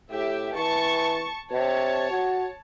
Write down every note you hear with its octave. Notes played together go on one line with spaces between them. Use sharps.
A2 G4 E5
E3 A5 C#6
C3 C#5 A5
F#4